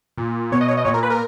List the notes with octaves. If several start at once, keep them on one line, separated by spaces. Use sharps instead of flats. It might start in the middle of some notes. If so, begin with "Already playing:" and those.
A#2
B2 C#5
D#5
C#5
D#5
A#2 C#5
A#4
B4
A#4